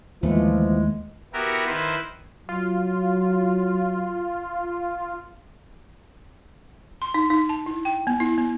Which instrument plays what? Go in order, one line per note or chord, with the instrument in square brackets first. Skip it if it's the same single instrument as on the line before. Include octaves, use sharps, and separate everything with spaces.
[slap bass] D#2 A3 [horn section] E3 F3 [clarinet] G#3
[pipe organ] B3 E4 F#4 G4 A#4
D#3 E4 B4 C5
[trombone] F#3 [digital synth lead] F4
[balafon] C6
D#4
D#4
A5
E4
G5
B3
E4
B3